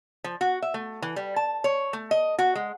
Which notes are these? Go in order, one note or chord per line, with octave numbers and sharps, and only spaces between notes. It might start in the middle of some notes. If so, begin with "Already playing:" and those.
F3
F#4
E5
A3
E3
G3
A5
C#5
A3
D#5
F#4
G#3